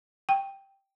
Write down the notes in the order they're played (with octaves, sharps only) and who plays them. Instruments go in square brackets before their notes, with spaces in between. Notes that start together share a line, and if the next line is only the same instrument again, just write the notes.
[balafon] G5